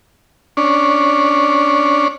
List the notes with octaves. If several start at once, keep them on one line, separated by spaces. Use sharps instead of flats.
C#4 D4